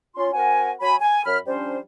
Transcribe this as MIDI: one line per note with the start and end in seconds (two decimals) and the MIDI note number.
0.16 0.32 61
0.16 0.32 65
0.16 0.32 84
0.33 0.71 60
0.33 0.71 66
0.33 0.71 70
0.33 0.71 78
0.33 0.71 80
0.82 0.96 54
0.82 0.96 80
0.82 0.96 83
1.01 1.21 80
1.25 1.38 42
1.25 1.38 83
1.25 1.38 89
1.47 1.77 53
1.47 1.77 55
1.47 1.77 61
1.47 1.77 62
1.47 1.77 72